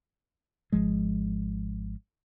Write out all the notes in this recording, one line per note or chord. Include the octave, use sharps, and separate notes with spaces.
G#1 F3 G#3